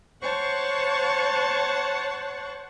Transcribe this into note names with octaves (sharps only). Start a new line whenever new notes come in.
C5 C#5 F#5 A5 C#6